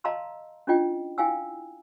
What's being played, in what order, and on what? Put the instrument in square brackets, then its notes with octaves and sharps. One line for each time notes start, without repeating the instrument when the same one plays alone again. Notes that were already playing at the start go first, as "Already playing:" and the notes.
[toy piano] D#5 F5 A5 A#5 C6 E6
C#4 D4 E4 F4 D#5 G5
E4 F5 G5 G#5 E6